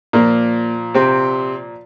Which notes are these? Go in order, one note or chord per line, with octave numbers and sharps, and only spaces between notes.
A#2 F3 A#3
C3 C4